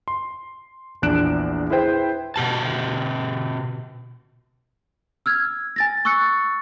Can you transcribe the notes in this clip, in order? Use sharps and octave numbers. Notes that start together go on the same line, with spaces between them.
C6
A#1 E2 D4 F#6 D7 E7
E4 G#4 B4 C5 G5
B2 G4 A5
E6 F6 G#6
G#5 A6 A#6
C#6 E6 F#6 A6 C#7